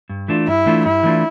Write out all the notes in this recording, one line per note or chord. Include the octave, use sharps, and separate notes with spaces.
G2
E3 A3 D4 F4
G2 E4
E3 A3 D4 F4
G2 E4
E3 A3 D4 F4